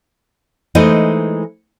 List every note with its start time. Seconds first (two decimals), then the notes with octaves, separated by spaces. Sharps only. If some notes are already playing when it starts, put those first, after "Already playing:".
0.75 E3 G#3 A3 D#4 C5 D#5